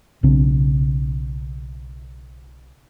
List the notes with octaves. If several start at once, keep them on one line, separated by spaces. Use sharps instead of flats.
B1 C#3 C4 D4